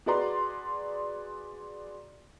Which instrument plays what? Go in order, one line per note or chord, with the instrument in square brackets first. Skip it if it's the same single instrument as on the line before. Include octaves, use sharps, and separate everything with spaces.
[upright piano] F#4 G#4 B4 D5 A#5 C6